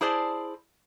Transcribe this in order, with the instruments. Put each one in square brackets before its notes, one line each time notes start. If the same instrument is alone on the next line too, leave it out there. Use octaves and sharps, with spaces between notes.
[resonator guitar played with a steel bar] E4 G#4 C5 D5 A5